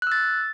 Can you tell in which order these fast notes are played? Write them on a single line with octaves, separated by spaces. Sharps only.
F#6 E6 A6